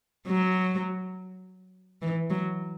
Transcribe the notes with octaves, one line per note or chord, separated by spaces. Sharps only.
F#3
E3
F#3